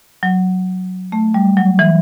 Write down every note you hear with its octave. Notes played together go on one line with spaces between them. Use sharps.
F#3
A3
G3
F#3
E3